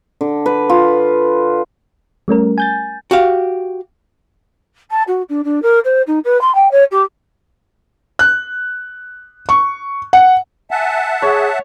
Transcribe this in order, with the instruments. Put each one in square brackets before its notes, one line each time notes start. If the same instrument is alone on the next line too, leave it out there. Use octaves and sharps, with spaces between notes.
[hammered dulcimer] D3
B4
F4
[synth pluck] G3 A3 C#4 A#4
G#5 G6 A6
[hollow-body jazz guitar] F#4 G4 F5
[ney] A5
F#4
D4
D4
A#4
C5
D#4
B4
C6
G5
C#5
G4
[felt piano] F#6
C#6
F#5
[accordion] E5 F#5 A5 [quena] G#5
[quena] G#4 [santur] C#5